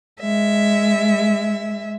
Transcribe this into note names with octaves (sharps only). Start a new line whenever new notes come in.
G#3 E5